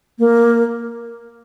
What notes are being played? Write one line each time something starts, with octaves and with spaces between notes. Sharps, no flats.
A#3